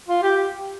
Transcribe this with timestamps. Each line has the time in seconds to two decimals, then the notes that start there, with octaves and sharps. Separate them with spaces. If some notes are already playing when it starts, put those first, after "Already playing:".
0.08 F4
0.23 G4